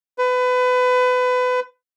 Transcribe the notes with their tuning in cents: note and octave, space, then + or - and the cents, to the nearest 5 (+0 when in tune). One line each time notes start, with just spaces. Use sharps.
B4 +25